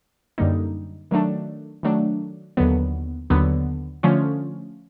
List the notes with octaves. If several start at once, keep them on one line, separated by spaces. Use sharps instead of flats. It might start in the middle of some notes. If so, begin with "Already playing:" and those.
F#2 D3 G3 A#3 D#4
D#3 F#3 A3 D4
D#3 F#3 A3 D4
D#2 D3 F#3 B3
D#2 D3 F#3 B3
D3 F3 A3 C#4 F4